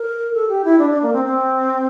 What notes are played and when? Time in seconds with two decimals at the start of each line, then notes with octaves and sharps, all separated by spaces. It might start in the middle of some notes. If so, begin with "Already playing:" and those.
Already playing: A#4
0.34 A4
0.49 G4
0.65 E4
0.79 D4
0.90 D4
1.03 A#3
1.13 C4
1.25 C4